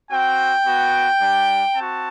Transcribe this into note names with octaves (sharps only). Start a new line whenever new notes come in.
C4 F#4 G5
B3 F#4
G3 D4 G4
C4 F#4 A5